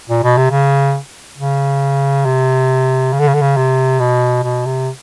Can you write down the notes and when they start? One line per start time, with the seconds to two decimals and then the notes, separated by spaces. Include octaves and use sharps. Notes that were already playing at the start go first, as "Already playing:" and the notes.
0.09 A#2
0.23 B2
0.37 C3
0.51 C#3
1.38 C#3
2.25 C3
3.13 C#3
3.19 D3
3.27 C#3
3.34 D3
3.41 C#3
3.56 C3
3.99 B2
4.43 B2
4.66 C3